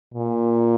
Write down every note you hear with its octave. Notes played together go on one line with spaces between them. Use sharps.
A#2